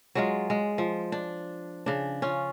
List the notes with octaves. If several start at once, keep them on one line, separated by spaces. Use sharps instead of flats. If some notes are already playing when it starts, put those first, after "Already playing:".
F#3 G#3 F4
G#3
F3
D4
C#3 D4
C#4 F4